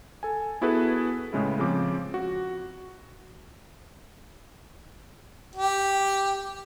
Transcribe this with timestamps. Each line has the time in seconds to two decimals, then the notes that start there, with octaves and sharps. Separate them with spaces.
0.23 A4 G#5
0.61 B3 E4 F#4 G#4 A4 B4
1.33 A2 C#3 G#3 E4
1.59 C#3 F3 C4 D6
2.14 F#4
5.55 G4